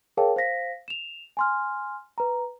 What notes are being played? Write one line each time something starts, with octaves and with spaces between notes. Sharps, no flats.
G#4 A#4 C#5 F5 G5 A5
C5 F5 A#6 B6
E7 F7
G#5 C6 F6
B4 A#5